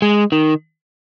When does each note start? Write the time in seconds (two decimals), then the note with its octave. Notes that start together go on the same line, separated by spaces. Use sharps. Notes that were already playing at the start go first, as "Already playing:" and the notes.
0.02 G#3
0.32 D#3